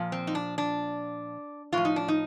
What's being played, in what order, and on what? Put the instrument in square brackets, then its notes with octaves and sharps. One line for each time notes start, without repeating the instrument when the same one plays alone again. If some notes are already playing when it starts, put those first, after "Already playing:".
Already playing: [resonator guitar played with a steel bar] A#2 F3
C4
D#4
D4
D4
A2 F3 F4
D#4
D4
D#4